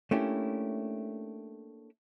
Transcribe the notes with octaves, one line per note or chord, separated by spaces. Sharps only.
A3 A#3 C#4 D4 E4 G4